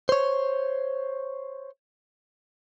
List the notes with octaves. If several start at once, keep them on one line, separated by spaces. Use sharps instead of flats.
C5 C#5